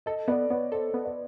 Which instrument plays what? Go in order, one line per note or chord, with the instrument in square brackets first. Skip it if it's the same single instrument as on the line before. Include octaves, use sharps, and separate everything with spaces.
[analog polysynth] A4 [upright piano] D#5
[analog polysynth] B3 [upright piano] D5
[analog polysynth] B3 [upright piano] C#5
[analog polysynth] A4 [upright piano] C5
[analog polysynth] B3
[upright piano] D5